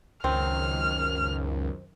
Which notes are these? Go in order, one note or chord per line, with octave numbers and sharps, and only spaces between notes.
C#2 F#2 D#3 C4 F6